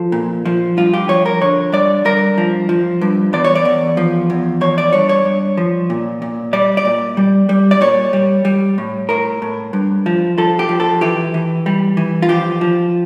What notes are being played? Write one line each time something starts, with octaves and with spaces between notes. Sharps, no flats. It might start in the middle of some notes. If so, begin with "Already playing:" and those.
Already playing: F3 A4
A#2
F3
G2 F4
G4
F3 C#5
A#4
D3 C#5
G2 D5
G2 A#4
F3
F3
G2
E2 D5
C#5
D5
E2
F3
E2
F3 C#5
D5
G2 C#5
C#5
G2
F3
A#2
A#2
G3 D5
D5
A#2
G3
G3
D5
A#2 C#5
G3
G3
A2
A2 A#4
A2
G2
F3
F3 A4
G4
F3
A4
E3 G4
E3
G3
E3
F4
F3 G4
F3